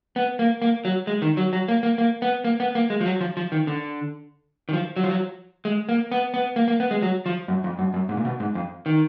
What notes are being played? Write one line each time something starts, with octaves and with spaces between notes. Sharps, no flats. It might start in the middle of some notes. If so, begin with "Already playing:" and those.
B3
A#3
A#3
F#3
G#3
D#3
F#3
F#3
A#3
A#3
A#3
B3
A#3
B3
A#3
G#3
F3
F#3
F3
F3
D#3
D3
D#3
F3
F#3
F3
F#3
G#3
A#3
B3
B3
A#3
A#3
B3
G#3
F#3
F3
F#2
F2
F#2
F#2
G#2
A#2
B2
G#2
F2
D#3